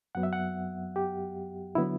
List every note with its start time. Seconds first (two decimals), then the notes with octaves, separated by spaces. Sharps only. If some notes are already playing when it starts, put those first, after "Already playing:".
0.15 F#2 F#3 B3 F#5
0.23 E5
0.33 F#5
0.96 G4
1.75 D3 F#3 B3 E4